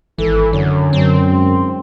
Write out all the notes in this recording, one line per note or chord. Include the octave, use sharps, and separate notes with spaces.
G#1 E3 A4
F#2 D3 C#5
F#2 C4
G#2 C6